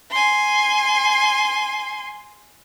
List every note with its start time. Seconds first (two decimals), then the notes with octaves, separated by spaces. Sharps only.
0.11 G#5 C6